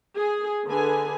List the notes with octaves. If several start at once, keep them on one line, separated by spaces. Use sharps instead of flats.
G#4
D3 G#4 B4 G#5